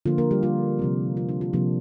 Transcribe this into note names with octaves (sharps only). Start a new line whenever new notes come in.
D3 F3 A#3 F4
A#3 A#4
G3 G4
F4
C3 F3 C4
F4
D4
F4
C3 F3 A#3 D4